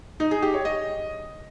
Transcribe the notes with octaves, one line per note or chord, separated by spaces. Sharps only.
D#4
G#4
G4
C#5
D#5